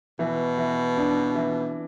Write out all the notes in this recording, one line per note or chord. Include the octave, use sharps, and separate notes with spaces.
B2 E3
E3
D4
E3